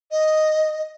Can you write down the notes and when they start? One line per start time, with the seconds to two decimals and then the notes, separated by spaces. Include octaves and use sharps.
0.11 D#5